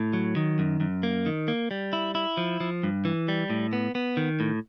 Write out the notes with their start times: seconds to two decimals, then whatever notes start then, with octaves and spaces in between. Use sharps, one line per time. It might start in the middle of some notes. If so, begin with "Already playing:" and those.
Already playing: A2
0.13 F#3
0.36 D#3
0.59 F#2
0.80 F#2
1.03 A#3
1.26 D#3
1.48 A#3
1.71 G3
1.93 E4
2.15 E4
2.37 F3
2.60 F3
2.83 G2
3.05 E3
3.28 G3
3.50 A2
3.73 B3
3.95 B3
4.17 D#3
4.40 A2